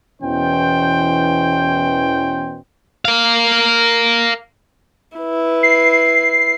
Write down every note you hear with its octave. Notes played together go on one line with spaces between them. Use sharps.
E2 B2 E3 C#4 C5 G5
A#4 F5
E4 B4
C7